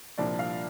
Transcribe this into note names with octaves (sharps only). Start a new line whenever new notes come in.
C2 A#2 F3 A#3 D4 D5
F5